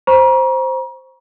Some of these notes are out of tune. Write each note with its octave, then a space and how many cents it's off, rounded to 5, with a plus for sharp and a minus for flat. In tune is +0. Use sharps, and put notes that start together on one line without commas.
C5 +0 A#5 +40 C#6 +10